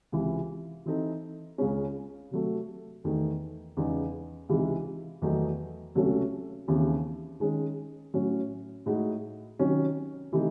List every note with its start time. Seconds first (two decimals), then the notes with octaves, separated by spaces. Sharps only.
0.12 C#2 C3 E3
0.86 E3 C4 D#4 A4
1.58 C#2 C#3 G#3 C#4
2.31 C3 F#3 A3
3.04 E2 D#3 A3
3.77 E2 C#3 G#3 D#4
4.49 C#2 C3 E3 G#3 D#4
5.22 E2 D#3 F#3 A3 D#4
5.95 C#2 C3 F#3 A3 C#4
6.68 D#2 C#3 E3 C4
7.40 D#3 G#3 C#4
8.14 A2 F#3 C#4
8.86 A2 G#3 D#4 F#4
9.59 C3 D#3 F#3 C#4
10.32 C3 E3 A3 D#4